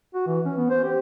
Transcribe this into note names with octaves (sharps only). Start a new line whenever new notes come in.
F#4
E3
C#4
B3
C5
G4